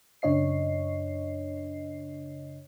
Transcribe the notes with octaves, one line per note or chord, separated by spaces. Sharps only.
F#2 C#3 D4 C#5 D#5 C7